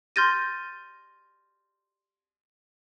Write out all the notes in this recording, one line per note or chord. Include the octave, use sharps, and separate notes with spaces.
C6 F6 G6 A6 A#6 D#7